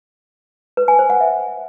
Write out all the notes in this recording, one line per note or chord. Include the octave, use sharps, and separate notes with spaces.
B4
G#5
C5
F#5
E5